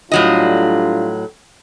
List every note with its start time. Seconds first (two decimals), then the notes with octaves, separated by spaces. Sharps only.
0.12 A2 F#3 G3 D4 F4 D#5